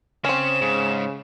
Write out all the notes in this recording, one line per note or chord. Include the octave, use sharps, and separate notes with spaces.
C#3 C4 C#4 E7
G#2 C#3